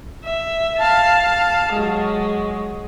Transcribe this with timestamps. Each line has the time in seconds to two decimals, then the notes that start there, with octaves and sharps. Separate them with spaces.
0.24 E5
0.78 F5 A5
1.73 F#3 G#3